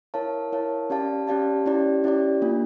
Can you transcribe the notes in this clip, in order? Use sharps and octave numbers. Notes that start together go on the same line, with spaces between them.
E4 A#4 C#5 F5 A5
E4 A#4 C#5 F5 A5
C#4 G4 D5 F5 A5
C#4 G4 D5 F5 A5
C#4 E4 G4 D5
C#4 E4 G4 D5
A#3 D4 F4